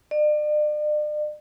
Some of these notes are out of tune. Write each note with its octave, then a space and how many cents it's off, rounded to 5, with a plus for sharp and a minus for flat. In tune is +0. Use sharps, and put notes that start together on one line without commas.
D5 +40